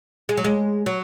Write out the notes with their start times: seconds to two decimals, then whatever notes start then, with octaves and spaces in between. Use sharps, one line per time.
0.29 G#3
0.37 F#3
0.44 G#3
0.86 F#3